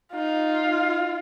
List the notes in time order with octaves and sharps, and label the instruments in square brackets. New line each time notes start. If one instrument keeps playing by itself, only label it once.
[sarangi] D#4 [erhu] F4